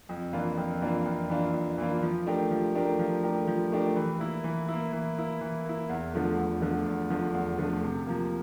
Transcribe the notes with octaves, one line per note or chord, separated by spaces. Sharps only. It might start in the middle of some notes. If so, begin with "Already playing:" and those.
F2
E3 A#3 D4 F4
F2
E3 A#3 D4 F4
F2
E3 A#3 D4 F4
F2
E3 A#3 D4 F4
F3
A3 D4 G4 A#4
F3
A3 D4 G4 A#4
F3
A3 D4 G4 A#4
F3
A3 D4 G4 A#4
E3
A#3 E4
E3
A#3 E4
E3
A#3 E4
E3
A#3 E4
E2
D3 F3 A3
E2
D3 F3 A3
E2
D3 F3 A3
E2
D3 F3 A3
C3
F3 A#3